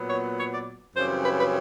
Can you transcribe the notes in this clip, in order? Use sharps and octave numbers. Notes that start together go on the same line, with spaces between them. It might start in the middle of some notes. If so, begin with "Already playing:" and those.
Already playing: A#2 F#3 B3
C#5
C#5
D5
F#2 C#3 E3 G3 C4 C5
B4
B4